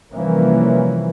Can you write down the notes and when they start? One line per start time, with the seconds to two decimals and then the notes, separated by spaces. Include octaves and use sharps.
0.11 C3 E3 F3 G3 A#3 C#4